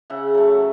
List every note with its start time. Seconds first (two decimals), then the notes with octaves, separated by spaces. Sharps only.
0.10 C#3 E5 F#5
0.34 F#3 A3